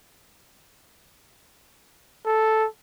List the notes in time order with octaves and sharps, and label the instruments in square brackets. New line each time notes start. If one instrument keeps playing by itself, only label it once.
[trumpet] A4